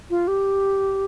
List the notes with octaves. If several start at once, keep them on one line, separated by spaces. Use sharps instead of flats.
F4
G4